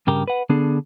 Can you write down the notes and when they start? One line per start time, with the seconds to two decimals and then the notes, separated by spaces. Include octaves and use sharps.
0.07 G2 C#3 G4 A#4
0.28 B4 F#5
0.50 D3 B3 D4 G#4 A4